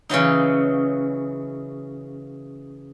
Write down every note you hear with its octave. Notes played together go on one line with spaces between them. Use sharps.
C#3 E3 F#3 D#4